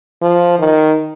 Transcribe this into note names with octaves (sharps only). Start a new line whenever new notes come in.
F3
D#3